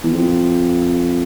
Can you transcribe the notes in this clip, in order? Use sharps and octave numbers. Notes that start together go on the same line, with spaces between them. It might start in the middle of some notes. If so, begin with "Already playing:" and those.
E2
F2